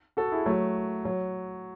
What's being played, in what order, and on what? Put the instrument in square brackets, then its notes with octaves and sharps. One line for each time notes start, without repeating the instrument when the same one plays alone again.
[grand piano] F#4 A4
E4 G#4
F#3 A3
F#3